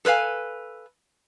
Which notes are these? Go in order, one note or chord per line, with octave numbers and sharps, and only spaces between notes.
A4 B4 C#5 F5 G#5